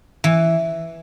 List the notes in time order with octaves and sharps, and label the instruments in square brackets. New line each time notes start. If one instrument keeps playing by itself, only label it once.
[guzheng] E3